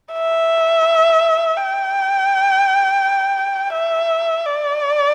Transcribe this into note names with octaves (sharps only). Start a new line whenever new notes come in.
E5
G5
E5
D5